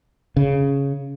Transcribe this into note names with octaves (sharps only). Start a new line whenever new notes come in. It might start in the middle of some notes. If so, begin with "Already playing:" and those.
C#3